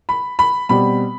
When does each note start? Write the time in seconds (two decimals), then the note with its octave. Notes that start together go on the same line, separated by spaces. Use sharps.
0.09 B5
0.39 B5
0.69 B2 G3 C4 B5